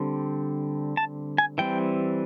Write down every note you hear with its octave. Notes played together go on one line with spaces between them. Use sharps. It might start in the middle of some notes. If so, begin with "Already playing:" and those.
Already playing: D3 G3 C4
A5
G#5
E3 G3 C4 G5